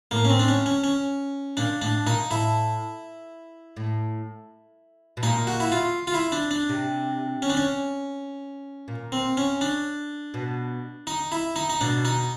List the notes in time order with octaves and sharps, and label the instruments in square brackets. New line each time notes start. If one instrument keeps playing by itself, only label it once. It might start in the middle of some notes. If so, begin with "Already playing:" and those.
[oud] A2 [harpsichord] A#3
[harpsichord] C#4
C4
D4
C#4
C#4
C#4
[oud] A#2 [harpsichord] D4
[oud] A2 [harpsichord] D4
[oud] A#2 [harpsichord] D#4
[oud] A2 [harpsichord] E4
[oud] A2
B2
[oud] A#2 [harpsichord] D#4
[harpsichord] F#4
E4
F4
F4
E4
D4
D4
[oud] C3
[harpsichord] C#4
D4
C#4
[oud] A#2
[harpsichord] C4
C#4
D4
[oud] B2
[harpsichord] D#4
E4
D#4
D#4
[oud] B2 [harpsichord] D4
[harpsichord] D#4